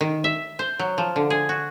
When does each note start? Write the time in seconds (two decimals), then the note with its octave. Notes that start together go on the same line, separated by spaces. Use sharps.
0.01 D#3
0.24 E5
0.59 C5
0.79 F#3
0.98 F3
1.16 D3
1.30 G#4
1.49 F#4